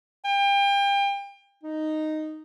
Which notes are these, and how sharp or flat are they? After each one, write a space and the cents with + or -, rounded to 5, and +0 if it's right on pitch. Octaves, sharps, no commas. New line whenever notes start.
G5 +35
D#4 -5